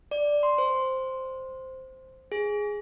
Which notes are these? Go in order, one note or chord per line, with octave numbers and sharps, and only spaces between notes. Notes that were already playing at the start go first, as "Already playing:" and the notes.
D5
C6
C5
G#4